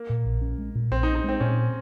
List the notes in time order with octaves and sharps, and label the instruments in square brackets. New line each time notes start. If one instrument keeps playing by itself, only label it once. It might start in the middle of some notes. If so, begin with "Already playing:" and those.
Already playing: [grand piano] A#3
[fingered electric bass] A#2
A#1
C#4
G#3
A#2
[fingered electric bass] A#1 [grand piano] C4
[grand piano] D#4
[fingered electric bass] C#4
[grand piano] D#4
[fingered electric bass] G#3 [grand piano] C4
[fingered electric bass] A#2 [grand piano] C#4